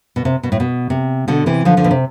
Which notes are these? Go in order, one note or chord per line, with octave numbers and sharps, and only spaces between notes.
B2
C3
B2
A2
B2
C3
B2 D3
C3 E3
D3 F3
D3 F3
B2
C3